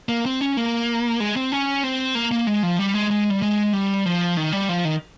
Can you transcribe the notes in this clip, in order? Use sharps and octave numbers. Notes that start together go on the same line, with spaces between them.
A#3
C4
C#4
A#3
G#3
C4
C#4
C4
A#3
A#3
G#3
F3
G3
G#3
G#3
G3
G#3
G3
F3
D#3
G3
F3
D#3